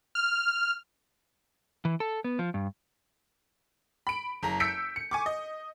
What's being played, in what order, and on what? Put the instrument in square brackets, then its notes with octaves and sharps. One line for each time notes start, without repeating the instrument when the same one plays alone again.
[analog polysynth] F6
[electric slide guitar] E3
A4
B3
F3
G2
[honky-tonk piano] B5 D7
F#1 A#5
E6 G6 B6 C#7 D7
C#7
G#5 C#6 D6
D#5